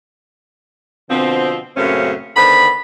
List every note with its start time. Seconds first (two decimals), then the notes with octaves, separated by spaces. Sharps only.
1.10 B2 D3 F3 C4
1.76 F#2 A#2 C#3 A3 C4 C#4
2.36 D3 D#3 B3 C5 B5